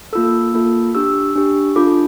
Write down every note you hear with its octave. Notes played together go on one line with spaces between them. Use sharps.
A#3 F4 A4 E6
A#3 F4 A4
D4 G4 E6
D4 G4
D4 F4 A4 D6